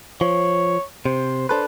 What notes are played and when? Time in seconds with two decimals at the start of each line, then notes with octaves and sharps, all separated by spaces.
0.21 F3 C#5
1.06 C3 C5
1.49 D4 A4 B4 C5